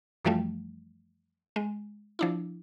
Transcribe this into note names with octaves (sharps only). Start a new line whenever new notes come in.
F#2 E3 F3 G3 A3
G#3
F3 D4 E4